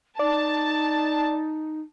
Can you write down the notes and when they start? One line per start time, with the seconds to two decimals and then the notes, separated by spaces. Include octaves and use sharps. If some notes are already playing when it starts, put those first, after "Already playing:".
0.19 D#4 D5 A5